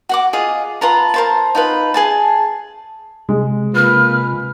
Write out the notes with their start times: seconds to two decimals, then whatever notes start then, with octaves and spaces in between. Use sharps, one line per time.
0.09 F#4 F#5 D6
0.33 F4 G#4 D#5
0.81 F4 B4 A5 A#5
1.14 A#4 C5 A5
1.55 D#4 F4 B4
1.94 G#4 G#5 A5
3.29 C3 G#3
3.75 A#3 F4 B4 F6